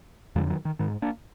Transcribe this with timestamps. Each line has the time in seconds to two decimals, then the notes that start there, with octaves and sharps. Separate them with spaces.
0.36 F2 D3 F3 G#3
0.50 D#3 F#3
0.65 D#3
0.79 G#2 D#3
1.02 A#3 D4